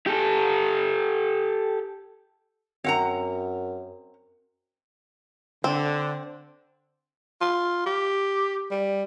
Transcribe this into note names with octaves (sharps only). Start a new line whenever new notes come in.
G4 A4
F#2 C4 F#5 A#5
D3 C4
F4
G4
G3